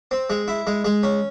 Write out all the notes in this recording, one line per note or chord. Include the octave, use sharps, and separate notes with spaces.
C4
G#3
E4
G#3
G#3
C#4